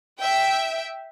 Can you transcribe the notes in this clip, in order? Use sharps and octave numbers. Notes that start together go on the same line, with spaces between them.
E5 G5